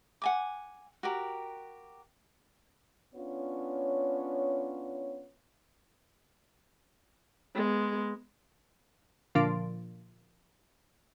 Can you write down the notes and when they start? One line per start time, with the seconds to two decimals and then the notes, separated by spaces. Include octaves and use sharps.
0.22 F#5 G#5 D6
1.03 F#4 G4 A#4
3.14 B3 C#4 D4 F4 C#5
7.55 G#3 B3
9.35 A#2 D3 F3 D4 A6 D7